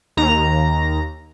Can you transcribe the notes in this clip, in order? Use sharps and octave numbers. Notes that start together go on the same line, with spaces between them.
D#2 A#5